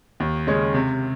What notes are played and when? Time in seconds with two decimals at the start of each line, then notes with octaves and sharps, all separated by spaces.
0.20 D#2
0.47 C#3 G#3 C#4
0.74 C3